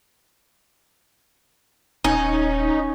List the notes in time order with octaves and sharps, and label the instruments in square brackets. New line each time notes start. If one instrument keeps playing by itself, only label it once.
[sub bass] D#1 [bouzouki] C#4 [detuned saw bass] D#4